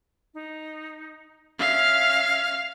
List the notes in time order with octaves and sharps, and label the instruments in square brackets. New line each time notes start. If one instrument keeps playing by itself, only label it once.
[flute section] D#4
[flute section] C#4 E5 F6 [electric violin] F5